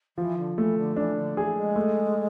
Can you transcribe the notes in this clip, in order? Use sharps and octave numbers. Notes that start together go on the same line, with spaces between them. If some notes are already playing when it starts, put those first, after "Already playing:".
E3 F3
D3
E3 A3
D3
E3 D4
D3
E3 G#4
G#3
A3